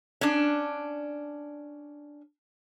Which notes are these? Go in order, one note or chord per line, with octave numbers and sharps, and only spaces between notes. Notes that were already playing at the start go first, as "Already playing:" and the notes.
C#4 D4